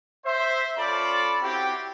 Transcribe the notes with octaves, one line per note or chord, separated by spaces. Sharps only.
C5 E5
C#4 F4 A4 D5 A5 B5
C4 E4 F#4 G4